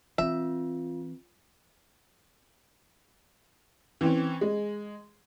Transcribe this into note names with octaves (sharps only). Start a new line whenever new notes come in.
E3 C4 F4 E5
E3 C4 C#4
G#3